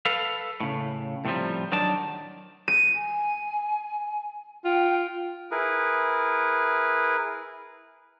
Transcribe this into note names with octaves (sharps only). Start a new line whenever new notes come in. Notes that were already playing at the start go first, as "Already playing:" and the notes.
A4 B4 F5
A2 C#3
A2 C3 D#3 F3 G3
D#3 F#3 D4 D5 A5
D#7
G#5
F4 G5
E4 G#4 A#4 B4